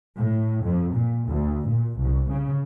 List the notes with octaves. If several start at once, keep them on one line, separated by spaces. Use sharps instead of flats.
A2
F2
A#2
D2
A#2
C2
C#3